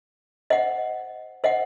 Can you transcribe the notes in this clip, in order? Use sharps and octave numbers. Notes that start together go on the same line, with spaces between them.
C5 D#5 F#5
C5 D#5 F#5